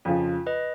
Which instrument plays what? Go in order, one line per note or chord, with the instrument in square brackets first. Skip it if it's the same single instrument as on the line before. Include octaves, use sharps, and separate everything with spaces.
[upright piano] F2 C#3 F3 [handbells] F4
[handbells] B4 D#5